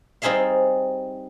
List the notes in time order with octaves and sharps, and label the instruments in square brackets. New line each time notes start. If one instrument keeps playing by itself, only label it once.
[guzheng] G3 C4 D#4 G#4 E5 F5